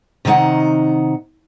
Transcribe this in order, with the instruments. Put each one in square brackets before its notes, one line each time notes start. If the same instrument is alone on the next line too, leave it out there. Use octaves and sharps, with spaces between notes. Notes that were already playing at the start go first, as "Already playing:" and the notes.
[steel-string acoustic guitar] C3 D#3 A3 D#4 F#5